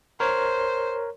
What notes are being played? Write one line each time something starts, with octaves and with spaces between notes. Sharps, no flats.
A#4 C5 C#5